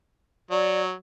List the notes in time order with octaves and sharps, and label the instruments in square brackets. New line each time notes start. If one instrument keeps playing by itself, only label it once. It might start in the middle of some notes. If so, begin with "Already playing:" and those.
[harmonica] F#3 [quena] D5